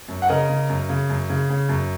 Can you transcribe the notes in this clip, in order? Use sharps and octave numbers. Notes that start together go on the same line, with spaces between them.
F#2
F#5
C#3 A#4 D#5
C#3
F#2
C#3
F#2
C#3
C#3
F#2